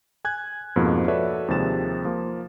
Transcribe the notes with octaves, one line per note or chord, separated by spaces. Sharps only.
G#5 F#6 G#6
F2 G#2 B2 F3 A#3
F#4 A4 B4 C#5 D5 E5
D#2 C3 F3 G#3 A6 E7
F3 A#3